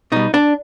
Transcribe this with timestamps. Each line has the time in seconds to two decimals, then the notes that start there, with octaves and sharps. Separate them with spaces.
0.12 B2 G3 D#4
0.34 D4